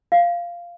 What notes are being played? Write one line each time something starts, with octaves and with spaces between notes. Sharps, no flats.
F5